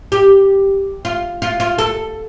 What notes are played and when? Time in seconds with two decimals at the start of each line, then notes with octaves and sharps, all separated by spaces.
0.12 G4
1.05 F4
1.42 F4
1.60 F4
1.78 A4